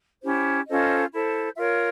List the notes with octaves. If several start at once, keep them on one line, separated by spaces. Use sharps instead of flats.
C#4 E4 G4 C5
C#4 F4 A4 C5 D#5
E4 A4 C5
F4 A#4 C#5 E5